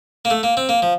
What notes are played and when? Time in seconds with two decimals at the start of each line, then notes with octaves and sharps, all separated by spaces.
0.25 A#3
0.30 A3
0.43 A#3
0.57 C4
0.69 A#3
0.82 F3